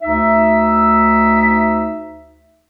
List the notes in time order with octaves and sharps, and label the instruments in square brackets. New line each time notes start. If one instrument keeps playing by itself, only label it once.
[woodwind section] D2 D#4 E5